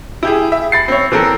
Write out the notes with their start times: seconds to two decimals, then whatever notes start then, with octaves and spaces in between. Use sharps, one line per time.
0.23 E4 G4 G#4
0.52 E5
0.72 B5 A6 C7
0.88 C4 C#5
1.12 E3 C4 A4 A#4